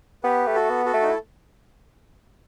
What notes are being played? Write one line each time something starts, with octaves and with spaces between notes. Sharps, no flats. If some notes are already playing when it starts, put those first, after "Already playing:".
B3 G4 B4
A3
F#4 A4
B3
F#4 A4
A3
D#4
E4